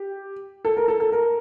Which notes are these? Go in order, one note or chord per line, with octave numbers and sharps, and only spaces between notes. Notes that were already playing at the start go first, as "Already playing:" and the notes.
Already playing: G4
A4
A#4
A4
A4
A#4